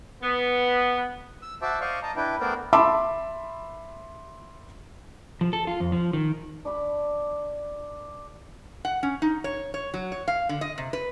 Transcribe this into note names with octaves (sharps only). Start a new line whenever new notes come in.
B3
E6
F#4 C5 E5 A5 D6 E6
C5 D5 D#5 F5 C#6
D#5 A5 A#5
D4 E4 B4 G5
A3 B3 A#4 C5 D5 G5
E5 A5 B5 C6 D6 E6
F3
A4
F4
F2
F3
D#3
D4 D5 B5
F#5
C#4
D#4
C#5
C#5
F#3
C#5
F5
D3
D#5
C3
B4